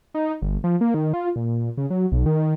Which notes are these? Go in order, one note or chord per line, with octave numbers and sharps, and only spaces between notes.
D#4
G1
F3
A#3
D#3
F4
A#2
C#3
F#3
B1
D#3